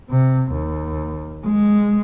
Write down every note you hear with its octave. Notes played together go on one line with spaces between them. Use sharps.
C3
D#2
G#3